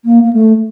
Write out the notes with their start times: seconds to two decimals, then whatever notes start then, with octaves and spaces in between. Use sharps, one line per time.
0.05 A#3
0.24 A#3
0.33 A3